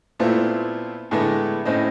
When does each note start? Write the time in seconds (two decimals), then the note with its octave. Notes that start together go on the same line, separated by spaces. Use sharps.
0.19 A#2 A3 B3 C4 E4 F4
1.11 A2 D3 G#3 A3 B3
1.65 A2 C4 C#4 D#5